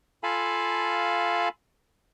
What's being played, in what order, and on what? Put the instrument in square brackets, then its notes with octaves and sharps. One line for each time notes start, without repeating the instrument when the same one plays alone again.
[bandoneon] F4 A4 F5 G#5 A5 B5